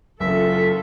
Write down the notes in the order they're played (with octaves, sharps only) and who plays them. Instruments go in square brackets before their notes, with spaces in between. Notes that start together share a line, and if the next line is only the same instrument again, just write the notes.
[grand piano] F#1 [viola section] F4 A4 [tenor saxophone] E5